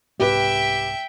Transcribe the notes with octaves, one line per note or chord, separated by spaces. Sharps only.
C2 G#2 B3 G4 B4 E5 G5